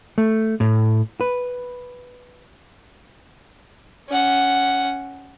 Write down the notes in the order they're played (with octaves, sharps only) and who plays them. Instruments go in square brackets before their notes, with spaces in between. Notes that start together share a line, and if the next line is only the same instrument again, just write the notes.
[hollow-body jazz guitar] A3
A2
B4
[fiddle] C#4 F#5